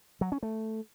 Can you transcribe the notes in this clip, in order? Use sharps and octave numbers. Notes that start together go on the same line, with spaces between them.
F#3
C#4
A3